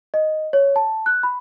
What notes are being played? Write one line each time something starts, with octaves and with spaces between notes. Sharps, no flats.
D#5
C#5
A5
F#6
B5